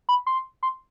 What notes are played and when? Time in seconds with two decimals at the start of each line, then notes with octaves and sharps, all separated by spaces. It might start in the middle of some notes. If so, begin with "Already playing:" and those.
0.09 B5
0.27 C6
0.63 C6